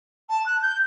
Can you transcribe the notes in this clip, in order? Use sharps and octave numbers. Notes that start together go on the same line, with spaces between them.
A5
F#6
G6